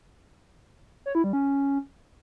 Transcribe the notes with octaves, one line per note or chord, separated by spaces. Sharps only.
C#5
E4
G3
C#4